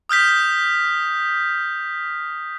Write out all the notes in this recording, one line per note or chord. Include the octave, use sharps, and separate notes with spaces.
D#6 F6 G6 B6